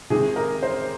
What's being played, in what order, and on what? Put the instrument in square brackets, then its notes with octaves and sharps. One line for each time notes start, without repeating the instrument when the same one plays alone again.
[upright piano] C3 D#3 G#3 [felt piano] G#4
[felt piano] A#4
C5